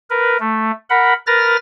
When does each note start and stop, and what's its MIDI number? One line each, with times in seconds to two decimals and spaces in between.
0.10 0.37 70
0.10 0.37 71
0.40 0.71 57
0.90 1.13 70
0.90 1.13 78
0.90 1.13 83
1.27 1.56 70
1.27 1.56 71
1.27 1.56 89
1.27 1.56 93
1.27 1.56 94